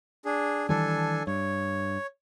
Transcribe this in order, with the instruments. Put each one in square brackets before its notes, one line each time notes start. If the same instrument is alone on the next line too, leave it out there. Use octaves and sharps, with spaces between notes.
[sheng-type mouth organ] D4 G#4
[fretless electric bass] D#3 E3 G3 [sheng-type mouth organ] D4 A4 G#5
[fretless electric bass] G2 [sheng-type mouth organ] C#5